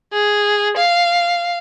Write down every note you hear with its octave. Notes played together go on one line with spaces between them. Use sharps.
G#4
F5